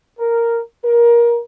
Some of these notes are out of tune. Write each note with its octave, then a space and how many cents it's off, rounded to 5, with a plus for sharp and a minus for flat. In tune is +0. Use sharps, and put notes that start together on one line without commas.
A#4 -5
A#4 +20